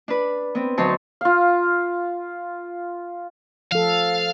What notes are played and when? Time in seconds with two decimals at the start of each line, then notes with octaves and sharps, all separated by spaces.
0.08 D4 B4
0.55 B3 C4
0.78 D2 F#3 D#4 C#5 A5 C6
1.21 F4 F5
3.72 F3 A4 F5